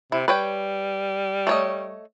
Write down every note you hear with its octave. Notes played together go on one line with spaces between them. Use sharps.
C3 E4
G3 B4 C#5 G5
A3 C#5 D#5